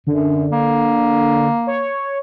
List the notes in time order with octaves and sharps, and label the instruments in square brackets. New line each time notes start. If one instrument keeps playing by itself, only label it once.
[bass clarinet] F#2 [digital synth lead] D3
[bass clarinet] A#3
[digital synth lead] C#5